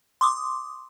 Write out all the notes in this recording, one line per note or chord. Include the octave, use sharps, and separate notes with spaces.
C6 D6 D#6